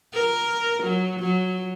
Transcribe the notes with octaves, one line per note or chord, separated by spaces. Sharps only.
A#4
F#3
F#3